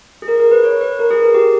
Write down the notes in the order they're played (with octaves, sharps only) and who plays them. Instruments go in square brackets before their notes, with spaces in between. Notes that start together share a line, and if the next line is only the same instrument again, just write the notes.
[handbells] G#4
A#4
A#4
B4
C#5
B4
A#4
G#4
A#4
G4